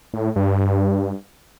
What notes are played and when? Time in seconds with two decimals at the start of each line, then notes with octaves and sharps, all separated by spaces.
0.14 A2
0.36 G2